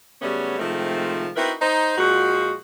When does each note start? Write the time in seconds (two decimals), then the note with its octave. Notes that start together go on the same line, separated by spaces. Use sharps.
0.22 C#3 F#3 G3 A3 B3 C#4
0.59 C3 D#3 F3 G#3 A3 C4
1.36 C4 D#4 E4 F#4 A#4 B4
1.61 D#4 C5
1.98 A#2 F3 G#3 F#4